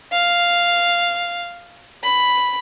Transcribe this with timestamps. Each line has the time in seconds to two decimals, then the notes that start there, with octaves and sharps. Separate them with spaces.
0.12 F5
2.04 B5